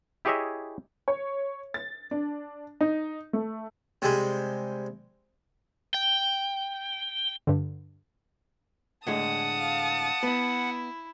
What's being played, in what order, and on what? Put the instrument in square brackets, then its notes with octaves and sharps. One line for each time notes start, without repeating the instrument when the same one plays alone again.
[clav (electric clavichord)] E4 G4 G#4 C#5 D#5 E5
[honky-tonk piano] C#5
A6
D4
D#4
A3
[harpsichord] C3 G3 G#3
[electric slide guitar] G5
[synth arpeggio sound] G2 D3
[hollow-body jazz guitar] A2 D3 G#3 [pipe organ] F#5 [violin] A5 D#6
[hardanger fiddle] F5
[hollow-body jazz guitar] B3 [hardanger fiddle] E4